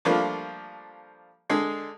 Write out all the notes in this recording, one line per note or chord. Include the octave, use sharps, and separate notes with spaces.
F3 G3 A3 A#3 D4
D3 G#3